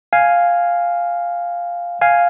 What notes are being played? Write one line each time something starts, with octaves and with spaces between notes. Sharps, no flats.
F5 G#5
F5 G#5